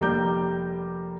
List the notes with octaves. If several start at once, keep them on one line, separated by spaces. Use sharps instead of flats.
F1 G3 A#3 A#5 D6 G6